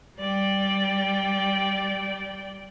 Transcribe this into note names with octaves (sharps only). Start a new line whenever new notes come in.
G3 D5 G5